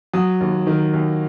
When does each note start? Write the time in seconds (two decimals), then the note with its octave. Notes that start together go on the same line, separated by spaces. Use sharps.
0.13 F#3 D#6
0.41 D#2
0.67 D#3
0.93 D#2